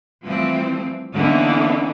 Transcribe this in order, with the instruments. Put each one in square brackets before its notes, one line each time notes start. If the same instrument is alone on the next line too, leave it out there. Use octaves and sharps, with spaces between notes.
[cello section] E3 F3 G3 A3 C4
D3 E3 A#3 B3 C#4 D#4